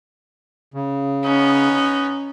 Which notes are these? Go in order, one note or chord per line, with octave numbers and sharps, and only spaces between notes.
C#3
B3 C#4 D#4